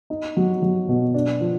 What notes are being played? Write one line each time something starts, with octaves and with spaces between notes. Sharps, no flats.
D#4
F#3
F#3
B2
D4
F3